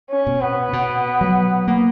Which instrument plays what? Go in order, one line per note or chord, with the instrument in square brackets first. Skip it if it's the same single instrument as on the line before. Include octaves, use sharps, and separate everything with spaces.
[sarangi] C#4
[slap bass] B2
[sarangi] B3
[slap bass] B2
F#3
A#3